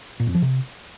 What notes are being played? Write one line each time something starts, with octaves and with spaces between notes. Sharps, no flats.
A#2
F2
F3
C3